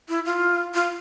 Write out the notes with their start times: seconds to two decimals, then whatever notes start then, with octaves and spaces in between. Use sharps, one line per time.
0.09 E4
0.25 F4
0.74 F4